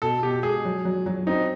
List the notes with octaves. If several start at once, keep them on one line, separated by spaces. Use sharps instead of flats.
B2 A4
B2 G4
G#3 G#4
F#3
F#3
F#3
C4 D#4